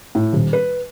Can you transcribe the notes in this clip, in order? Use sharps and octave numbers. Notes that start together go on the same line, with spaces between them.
A2
D#1
B4